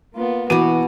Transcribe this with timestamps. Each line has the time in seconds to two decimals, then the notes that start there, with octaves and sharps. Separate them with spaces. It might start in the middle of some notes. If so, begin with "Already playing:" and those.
0.13 A#3 B3 F4
0.50 B2 E3 B3 F#4 D6 D#7